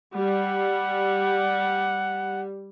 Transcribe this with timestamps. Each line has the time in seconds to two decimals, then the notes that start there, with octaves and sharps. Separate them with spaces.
0.15 G3 F#5